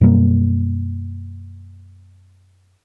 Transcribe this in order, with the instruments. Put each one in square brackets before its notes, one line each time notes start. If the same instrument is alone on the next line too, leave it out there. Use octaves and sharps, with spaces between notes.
[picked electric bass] F#2 B2 G3 A#3